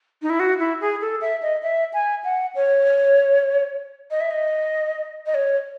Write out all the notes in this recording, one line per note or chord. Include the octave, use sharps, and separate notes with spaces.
D#4
E4
F#4
E4
G#4
A4
E5
D#5
E5
G#5
F#5
C#5
D#5
E5
D#5
D#5
C#5